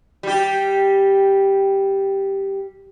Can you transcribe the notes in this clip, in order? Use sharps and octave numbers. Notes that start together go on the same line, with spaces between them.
G3 G4